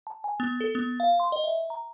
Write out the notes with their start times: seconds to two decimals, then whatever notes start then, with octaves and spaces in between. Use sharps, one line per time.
0.07 A5
0.24 G#5
0.40 B3
0.60 A4
0.75 B3
1.00 F5
1.20 C6
1.32 D#5
1.44 E5
1.70 A#5